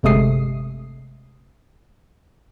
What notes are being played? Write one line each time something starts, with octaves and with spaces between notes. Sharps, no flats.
G1 C3 G#3 A3 D#6 C7